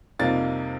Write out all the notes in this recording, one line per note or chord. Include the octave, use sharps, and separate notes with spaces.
F2 C3 G3 A#3 D#4 A6